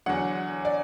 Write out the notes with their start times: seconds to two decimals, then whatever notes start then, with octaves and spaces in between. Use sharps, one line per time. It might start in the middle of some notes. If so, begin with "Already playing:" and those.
0.06 E2 D3 F#3 F#5
0.65 D5